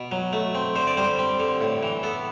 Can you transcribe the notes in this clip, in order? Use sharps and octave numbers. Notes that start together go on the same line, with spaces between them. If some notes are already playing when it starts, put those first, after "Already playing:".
Already playing: B2
F#3
A3
C4
D3 C5
D5
G3 C5
C4
D3
A2
E3
B3 A4